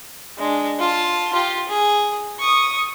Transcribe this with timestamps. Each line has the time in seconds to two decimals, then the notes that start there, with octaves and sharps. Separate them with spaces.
0.38 G#3 D4
0.79 F4 A5
1.33 F4 G4
1.68 G#4
2.39 C#6 D#6